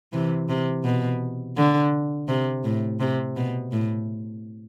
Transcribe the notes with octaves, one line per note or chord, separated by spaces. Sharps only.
C3 E3
C3
B2
D3
C3
A2
C3
B2
A2